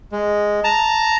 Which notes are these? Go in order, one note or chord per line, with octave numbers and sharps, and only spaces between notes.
G#3
A5 A#5